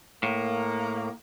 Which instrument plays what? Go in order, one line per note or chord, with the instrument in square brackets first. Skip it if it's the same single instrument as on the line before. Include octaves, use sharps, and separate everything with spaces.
[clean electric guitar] A2 [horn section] A#3